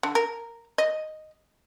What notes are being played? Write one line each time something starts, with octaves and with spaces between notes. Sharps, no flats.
D3
A#4
D#5